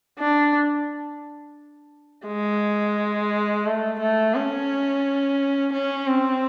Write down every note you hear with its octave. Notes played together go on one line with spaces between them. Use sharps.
D4
G#3
A3
A3
C#4
C#4
C4